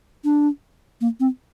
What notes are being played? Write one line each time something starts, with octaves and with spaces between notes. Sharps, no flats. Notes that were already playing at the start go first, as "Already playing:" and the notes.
D4
A#3
C4